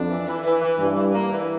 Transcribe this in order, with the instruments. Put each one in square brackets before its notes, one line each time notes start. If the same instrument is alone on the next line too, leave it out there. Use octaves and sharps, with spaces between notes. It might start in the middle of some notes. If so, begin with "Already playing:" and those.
Already playing: [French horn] F2 [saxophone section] D4
[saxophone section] E3
E3
E3
E3
[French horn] G2 [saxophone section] E3
[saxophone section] E3
A#3
E3